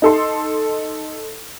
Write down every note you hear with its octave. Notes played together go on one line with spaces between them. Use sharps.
D#4 A4 C6